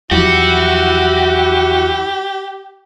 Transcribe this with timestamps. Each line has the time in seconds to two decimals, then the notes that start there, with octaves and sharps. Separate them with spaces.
0.11 E2 F3 F#3 E4 F#4 G4